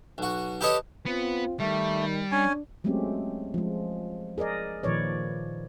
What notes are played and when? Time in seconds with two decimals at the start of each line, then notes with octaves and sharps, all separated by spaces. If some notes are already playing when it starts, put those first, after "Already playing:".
0.18 B1 F#4
0.61 G4 A4 B4 C#5 D#5 A5
1.06 B3 C4 F4
1.60 D#3 G3 A3
2.32 C#4 D4 G#5
2.84 F#3 G#3 A3 C4 C#4 G4
3.54 F3 G#3
4.38 G#4 A#4 D5 D#5
4.83 A#2 D#3 F3 B4 C#5 D5